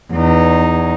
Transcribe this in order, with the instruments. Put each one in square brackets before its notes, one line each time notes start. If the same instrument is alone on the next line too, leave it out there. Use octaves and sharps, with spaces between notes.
[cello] E2 D#4